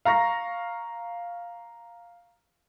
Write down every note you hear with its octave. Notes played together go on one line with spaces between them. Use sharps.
F5 A#5 C#6 A#6